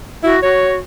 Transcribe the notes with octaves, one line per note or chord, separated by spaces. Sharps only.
E4 F#4
F#4 C#5